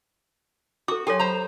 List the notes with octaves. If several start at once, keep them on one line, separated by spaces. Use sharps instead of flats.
F#4 A4 D6
F#3 G4 A4 C#5 G#5 C6
C5 A#5 B5